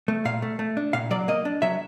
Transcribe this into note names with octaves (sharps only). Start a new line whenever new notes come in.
A3
A#2 F5
A3
A3
D4
A#2 F5
F#3 D5
A#3 D#5
D4
F#3 E5